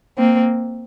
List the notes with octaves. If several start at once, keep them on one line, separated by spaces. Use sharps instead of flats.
A#3 C4